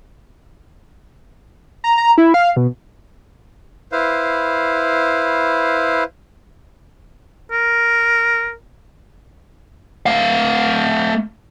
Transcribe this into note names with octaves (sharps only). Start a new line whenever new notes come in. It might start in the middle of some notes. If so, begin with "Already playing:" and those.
A#5
A#5
E4
F5
B2
E4 B4 C5 F5
A#4
A3 F5